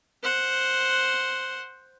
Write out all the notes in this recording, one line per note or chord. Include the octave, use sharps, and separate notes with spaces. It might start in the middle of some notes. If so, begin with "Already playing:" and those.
C5 F#5